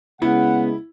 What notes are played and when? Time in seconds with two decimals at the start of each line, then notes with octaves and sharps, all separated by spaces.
0.22 C#3 G#3 B3 E4 F#5